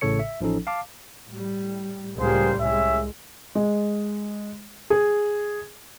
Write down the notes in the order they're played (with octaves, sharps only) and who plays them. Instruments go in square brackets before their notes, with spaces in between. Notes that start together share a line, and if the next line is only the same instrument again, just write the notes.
[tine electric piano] A1 A2 C#3 A4 C#5 C#7
E5
A1 F3 C#4 D#4 A4
F5 A5 D6
[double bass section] A2 G3
[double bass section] C#2 A2 G3 [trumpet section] A#3 G#4 C5
[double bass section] C2 G#3 [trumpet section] C#4 E5
[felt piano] G#3
G#4